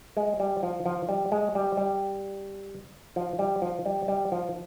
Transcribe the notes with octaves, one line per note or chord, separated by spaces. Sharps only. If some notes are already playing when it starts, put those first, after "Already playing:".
G#3
G3
F3
F3
G3
G#3
G3
G3
F3
G3
F3
G3
G3
F3